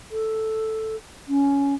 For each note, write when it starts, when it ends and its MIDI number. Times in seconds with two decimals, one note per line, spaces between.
0.11 0.96 69
1.28 1.75 61